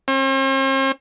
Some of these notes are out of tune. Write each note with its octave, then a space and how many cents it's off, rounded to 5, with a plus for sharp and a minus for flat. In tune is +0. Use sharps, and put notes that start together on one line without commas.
C4 +45